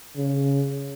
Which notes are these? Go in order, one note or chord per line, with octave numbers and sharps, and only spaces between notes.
C#3